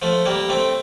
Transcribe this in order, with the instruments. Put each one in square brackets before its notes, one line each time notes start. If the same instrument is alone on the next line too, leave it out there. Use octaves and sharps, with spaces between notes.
[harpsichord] F3 A3
G3 A#3
A3 C4